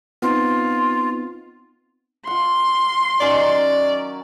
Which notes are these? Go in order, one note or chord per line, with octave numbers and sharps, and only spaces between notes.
B3 C4 D#4 F4
F4 F#5 C6
D#3 F#3 C#4 D5